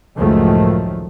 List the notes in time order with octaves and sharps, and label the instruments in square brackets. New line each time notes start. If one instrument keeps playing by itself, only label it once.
[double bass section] C#2 F#2 A2 D#3 F3 A3